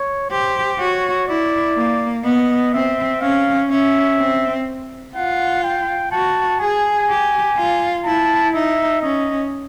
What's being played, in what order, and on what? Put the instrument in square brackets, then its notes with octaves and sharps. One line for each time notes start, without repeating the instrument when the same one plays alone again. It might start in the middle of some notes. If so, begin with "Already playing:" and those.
Already playing: [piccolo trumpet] C#5
[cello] G4 [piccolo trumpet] C5
[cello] F#4 [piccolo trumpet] C#5
[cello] E4 [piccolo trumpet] D5
[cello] A#3
[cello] B3 [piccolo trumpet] D#5
[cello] C4 [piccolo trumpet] E5
[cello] C#4 [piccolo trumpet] F5
[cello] C#4 [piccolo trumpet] E5
[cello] C4
[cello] F4 [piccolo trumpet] F#5
[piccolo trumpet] G5
[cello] F#4 [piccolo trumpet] A5
[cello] G#4 [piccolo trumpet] G#5
[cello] G4
F4
[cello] E4 [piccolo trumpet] A5
[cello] D#4 [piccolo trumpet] E5
[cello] C#4 [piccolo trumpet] D#5